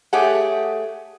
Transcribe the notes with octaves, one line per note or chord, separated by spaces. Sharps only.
A3 G4 G#4 C#5 F#5